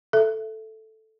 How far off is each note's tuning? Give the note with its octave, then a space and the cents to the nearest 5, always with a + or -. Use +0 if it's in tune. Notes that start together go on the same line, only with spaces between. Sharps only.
A4 +0 E5 +10